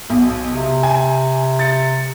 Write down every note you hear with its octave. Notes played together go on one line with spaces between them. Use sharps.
B1 B2
C3
G#5
A6 C#7